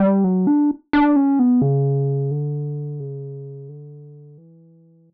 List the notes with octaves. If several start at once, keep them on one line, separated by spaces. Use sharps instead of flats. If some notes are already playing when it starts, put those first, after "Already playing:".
Already playing: G3
F#3
D4
D4
C#4
B3
C#3
D3
C#3
D3
E3